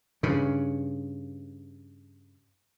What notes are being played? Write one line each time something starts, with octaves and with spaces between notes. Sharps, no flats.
G2 C#3